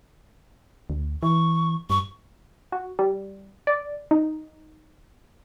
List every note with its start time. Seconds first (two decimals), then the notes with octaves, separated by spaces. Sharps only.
0.90 D2
1.23 E3 C#6
1.90 G2 C#6
2.72 F#4
2.99 G3
3.67 D5
4.11 D#4